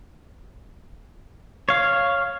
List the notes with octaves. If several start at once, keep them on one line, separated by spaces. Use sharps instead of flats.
C#5 F5